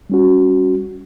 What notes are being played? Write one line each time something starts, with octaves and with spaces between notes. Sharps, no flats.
G3 C#4 F#4